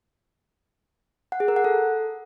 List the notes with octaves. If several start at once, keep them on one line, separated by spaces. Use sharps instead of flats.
F#5
G#4
A#4
F#5
A4